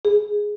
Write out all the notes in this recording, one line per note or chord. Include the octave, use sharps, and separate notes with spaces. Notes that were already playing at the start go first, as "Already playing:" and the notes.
G#4